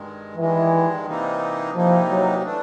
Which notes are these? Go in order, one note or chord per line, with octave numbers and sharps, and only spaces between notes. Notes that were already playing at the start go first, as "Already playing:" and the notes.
Already playing: G2 D#3 G#3
G2 D#3 E3 G#3
C3 E3 G3 A#3 D#4
C3 E3 F3 G3 A#3 D#4
F#3
E3 A3 D4